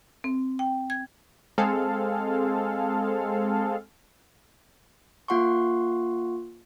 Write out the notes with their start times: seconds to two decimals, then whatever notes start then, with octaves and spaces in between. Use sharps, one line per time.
0.24 C4
0.59 G5
0.90 G#6
1.58 G#3 C4 G#4 A4 F5
5.28 A#3 F4 F#5 C6 C#6